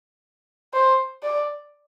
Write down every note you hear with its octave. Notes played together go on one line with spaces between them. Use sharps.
C5
D5